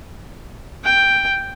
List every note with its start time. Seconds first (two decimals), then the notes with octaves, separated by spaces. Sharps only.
0.84 G5